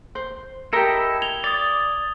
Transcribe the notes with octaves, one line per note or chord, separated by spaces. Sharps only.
C5
E4 G4 A4 A#4 D#5
G#6 F7 G7
D5 D#6 A6